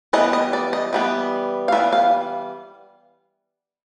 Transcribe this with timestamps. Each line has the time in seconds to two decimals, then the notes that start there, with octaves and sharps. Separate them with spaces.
0.13 E3 G3 B3 D#5
0.33 D#5
0.53 D5
0.73 D#5
0.93 E3 G3 B3
1.68 F5
1.72 E3 G3 B3 E5
1.93 F5